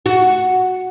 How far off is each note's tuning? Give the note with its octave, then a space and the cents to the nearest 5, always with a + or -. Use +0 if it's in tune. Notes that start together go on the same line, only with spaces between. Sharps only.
F#4 -5